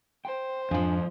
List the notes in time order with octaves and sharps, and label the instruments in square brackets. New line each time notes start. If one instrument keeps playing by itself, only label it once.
[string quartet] C5 [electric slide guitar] G5
[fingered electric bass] F2 [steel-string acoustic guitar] G#2 F3 [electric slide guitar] D4 F5 G#5